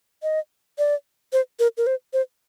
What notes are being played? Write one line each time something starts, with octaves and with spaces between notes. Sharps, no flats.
D#5
D5
C5
A#4
A#4
C5
C5